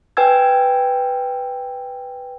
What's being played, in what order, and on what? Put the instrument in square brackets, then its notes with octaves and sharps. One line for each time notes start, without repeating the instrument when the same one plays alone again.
[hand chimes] B4 G5 G#5 E6 G#6